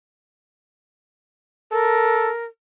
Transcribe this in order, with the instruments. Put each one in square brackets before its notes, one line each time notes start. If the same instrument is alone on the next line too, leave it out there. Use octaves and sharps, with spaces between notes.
[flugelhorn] A4 [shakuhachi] A#4